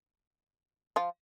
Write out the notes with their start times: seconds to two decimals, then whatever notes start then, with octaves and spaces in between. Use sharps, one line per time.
0.96 F3 F4